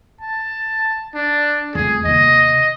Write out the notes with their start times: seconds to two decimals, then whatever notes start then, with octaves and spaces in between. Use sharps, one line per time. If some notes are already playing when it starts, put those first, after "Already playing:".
0.21 A5
1.15 D4
1.75 F2 A3 G#4
2.05 D#2 C3 D#5